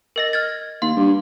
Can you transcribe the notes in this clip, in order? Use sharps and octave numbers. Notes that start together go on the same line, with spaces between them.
A#4 D#5 A#6
F6 G#6 A6
D#2 F5 C6
G2